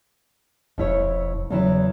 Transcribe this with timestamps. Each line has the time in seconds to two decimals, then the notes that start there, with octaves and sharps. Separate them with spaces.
0.78 E1 F2 E4 C#5
1.50 E2 C#3 F#3 E4